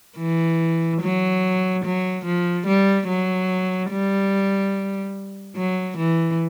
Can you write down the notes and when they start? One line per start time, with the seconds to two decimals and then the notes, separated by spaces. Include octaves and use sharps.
0.18 E3
1.01 F#3
1.84 F#3
2.25 F3
2.66 G3
3.08 F#3
3.91 G3
5.56 F#3
5.97 E3